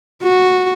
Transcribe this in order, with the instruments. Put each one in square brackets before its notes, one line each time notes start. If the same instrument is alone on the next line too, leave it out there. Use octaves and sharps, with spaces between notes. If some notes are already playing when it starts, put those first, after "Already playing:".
[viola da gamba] F#4